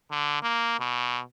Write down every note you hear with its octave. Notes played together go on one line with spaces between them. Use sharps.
D3
A#3
B2